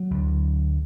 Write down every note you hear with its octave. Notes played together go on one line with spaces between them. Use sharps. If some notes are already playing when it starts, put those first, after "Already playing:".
Already playing: F#3
D2 D3